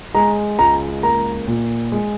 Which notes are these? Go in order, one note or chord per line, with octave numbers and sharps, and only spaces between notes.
G#3 A#5
C#2 A#5
A#3 A#5
A#2
G#3